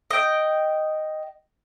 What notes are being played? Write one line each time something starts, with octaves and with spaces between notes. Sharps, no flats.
D#5 G5